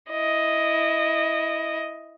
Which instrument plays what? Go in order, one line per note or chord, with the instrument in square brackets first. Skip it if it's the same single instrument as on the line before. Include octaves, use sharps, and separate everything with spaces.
[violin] E4 D#5